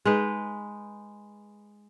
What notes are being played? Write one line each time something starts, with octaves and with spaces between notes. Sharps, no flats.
G#3 D#4 B4